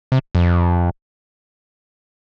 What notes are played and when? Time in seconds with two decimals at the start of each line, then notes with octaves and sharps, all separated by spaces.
0.12 C3
0.35 F2